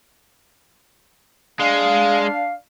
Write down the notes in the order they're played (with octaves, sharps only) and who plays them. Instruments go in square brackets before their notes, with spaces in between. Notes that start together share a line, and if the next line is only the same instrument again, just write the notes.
[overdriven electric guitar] G#3 [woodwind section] D4 F5